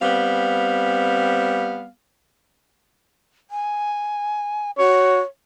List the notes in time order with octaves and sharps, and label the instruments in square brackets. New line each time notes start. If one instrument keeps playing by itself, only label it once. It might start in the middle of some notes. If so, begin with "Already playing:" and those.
[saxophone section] G3 B3 C4 F5
[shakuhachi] G#5
[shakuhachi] F#4 [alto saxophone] C#5